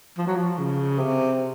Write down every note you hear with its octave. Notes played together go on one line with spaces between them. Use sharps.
F3
F#3
F3
C#3
C3